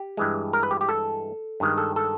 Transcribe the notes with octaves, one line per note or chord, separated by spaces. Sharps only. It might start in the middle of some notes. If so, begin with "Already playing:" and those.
Already playing: G4
G2 E3 G#3
A#4
B4
G4
G4
A4
G2 D#3 G#3
A4
A4